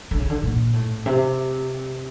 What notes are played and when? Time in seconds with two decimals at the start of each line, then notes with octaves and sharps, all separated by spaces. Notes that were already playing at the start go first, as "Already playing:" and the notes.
0.11 D3
0.19 C#3
0.30 D3
0.43 A#2
0.73 A2
1.06 C3